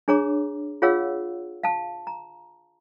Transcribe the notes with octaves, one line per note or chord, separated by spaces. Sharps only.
D4 G#4 C#5 A#5 D6
F4 G#4 C#5 F5 F#5 E6
F5 A5
A#5